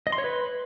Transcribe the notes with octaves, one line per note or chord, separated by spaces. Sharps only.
D#5
C6
C#5
B4